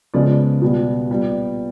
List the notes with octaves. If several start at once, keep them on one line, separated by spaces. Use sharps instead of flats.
C#3 F3 G#3 B3 D5
B2 G3 B3
A#2 G3 B3